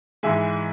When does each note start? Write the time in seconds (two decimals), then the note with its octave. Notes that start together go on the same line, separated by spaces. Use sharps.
0.23 G#2 E3 G#3 E5 G#5